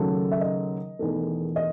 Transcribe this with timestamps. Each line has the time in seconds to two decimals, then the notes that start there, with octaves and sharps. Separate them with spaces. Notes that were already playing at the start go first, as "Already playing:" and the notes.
Already playing: D#2 C#3 F#3 A3 A4
0.31 E5
0.41 D#5
0.99 E1 E2 D#3 A3
1.56 D#5